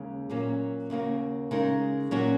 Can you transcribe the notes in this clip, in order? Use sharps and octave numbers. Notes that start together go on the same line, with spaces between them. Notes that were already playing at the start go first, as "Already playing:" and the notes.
Already playing: D#2 C#3 G#3 D#4
A#2 F#3 A#3 C#4
D#2 C#3 A#3 F#4
C#3 G#3 D#4 A#4
A#2 F#3 A#3 C#4 F#4